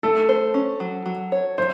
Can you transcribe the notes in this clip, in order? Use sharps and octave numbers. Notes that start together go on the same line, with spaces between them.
A3 A4
C5
C#4
F#3
F#3
C#5
F#3 C5